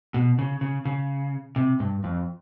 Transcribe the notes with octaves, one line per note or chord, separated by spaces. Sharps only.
B2
C#3
C#3
C#3
C3
G2
F2